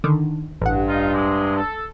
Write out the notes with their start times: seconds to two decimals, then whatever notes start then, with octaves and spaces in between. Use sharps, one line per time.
0.04 D3 D#3
0.62 A1 G2 F#5
0.87 D#4 F4
1.13 C3 G#3
1.57 A4